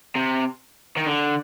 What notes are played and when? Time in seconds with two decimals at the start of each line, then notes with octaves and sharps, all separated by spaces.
0.15 C3
0.97 D#3
1.06 D3